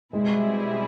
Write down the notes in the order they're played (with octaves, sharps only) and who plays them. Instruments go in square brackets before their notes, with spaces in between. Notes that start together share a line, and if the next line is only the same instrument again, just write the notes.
[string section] B2 G3 C4 E4 G#4 [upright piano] G#3